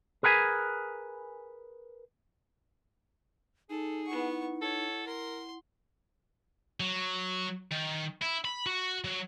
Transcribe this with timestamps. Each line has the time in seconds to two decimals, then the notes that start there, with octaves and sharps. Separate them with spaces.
0.23 G#4 A#4 B4 G5 G#5
3.70 D#4 G#4 A4
4.07 B3 E4 F#5 C#6
4.62 A4 C#5
5.07 A#4 C6
6.80 F#3
7.72 D#3
8.22 E4
8.45 B5
8.66 F#4
9.04 F#3